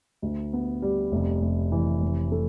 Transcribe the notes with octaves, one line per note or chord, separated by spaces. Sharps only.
D2
B3
G3
F1
F1
E3
F1
A3